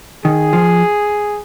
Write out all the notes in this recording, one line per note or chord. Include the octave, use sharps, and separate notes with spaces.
D#3 G#4
F3